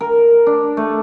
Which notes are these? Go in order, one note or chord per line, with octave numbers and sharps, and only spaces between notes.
A#4
D4
A3